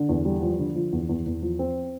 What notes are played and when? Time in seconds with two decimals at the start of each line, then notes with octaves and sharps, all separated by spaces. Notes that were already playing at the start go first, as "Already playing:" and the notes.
Already playing: D3
0.09 E2
0.25 G3
0.42 F3
0.59 D3
0.75 F3
0.92 E2
1.09 E2
1.26 E2
1.42 F3
1.59 C4